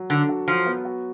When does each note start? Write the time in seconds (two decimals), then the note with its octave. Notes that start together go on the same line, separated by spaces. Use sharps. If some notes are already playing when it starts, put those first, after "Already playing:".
Already playing: F#3
0.10 D3 A4
0.29 F#4
0.48 F3 F#3
0.66 B3
0.85 F#4